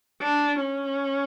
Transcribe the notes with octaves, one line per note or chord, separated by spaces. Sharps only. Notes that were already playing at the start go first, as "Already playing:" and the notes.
D4
C#4